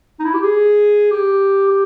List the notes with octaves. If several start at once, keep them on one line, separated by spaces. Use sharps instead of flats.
D#4
E4
G4
G#4
G4
G4